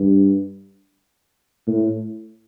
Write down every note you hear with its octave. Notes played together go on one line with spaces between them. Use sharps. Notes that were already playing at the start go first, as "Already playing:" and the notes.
Already playing: G2
A2